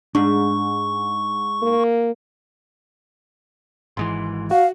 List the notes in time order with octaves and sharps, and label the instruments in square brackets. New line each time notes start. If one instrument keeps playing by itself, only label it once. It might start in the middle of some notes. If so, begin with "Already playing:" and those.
[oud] G#2 [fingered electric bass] D4 [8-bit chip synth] C#6
[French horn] A#3
[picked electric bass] G#1 G#2 E3 [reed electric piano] C6
[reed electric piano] F#4 [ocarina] F5